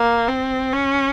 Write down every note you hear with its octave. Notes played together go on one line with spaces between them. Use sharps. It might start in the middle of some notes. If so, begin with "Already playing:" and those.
Already playing: A#3
C4
C#4